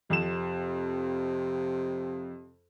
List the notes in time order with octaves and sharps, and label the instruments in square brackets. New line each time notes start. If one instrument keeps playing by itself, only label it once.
[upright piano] F2 E7 [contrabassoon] C3